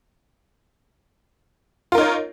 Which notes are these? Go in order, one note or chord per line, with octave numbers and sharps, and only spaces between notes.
D#4 F4 A#4 C#5